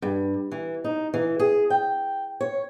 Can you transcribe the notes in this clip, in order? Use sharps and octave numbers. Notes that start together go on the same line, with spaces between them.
G2
E3
D#4
E3
G#4
G5
C#5